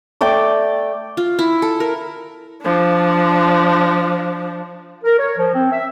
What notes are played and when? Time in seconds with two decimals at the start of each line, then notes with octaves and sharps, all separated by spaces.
0.21 A3 D5 G5 D6
1.17 F4
1.39 E4
1.62 A4
1.80 A#4
2.62 F3 D4
5.04 A#4
5.18 C#5
5.37 F3
5.54 C4
5.71 E5